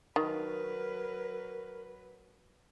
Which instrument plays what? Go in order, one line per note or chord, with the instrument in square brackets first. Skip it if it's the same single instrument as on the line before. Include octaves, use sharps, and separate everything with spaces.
[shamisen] D#3 [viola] F#3 B4 [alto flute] A#4